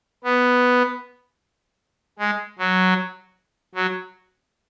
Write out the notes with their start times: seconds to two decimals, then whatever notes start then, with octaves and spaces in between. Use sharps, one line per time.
0.24 B3
2.19 G#3
2.59 F#3
3.75 F#3